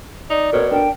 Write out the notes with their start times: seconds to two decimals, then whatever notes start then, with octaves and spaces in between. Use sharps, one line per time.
0.30 D#4 D5
0.53 B2 A#4 C#5
0.71 D4 A#4 G5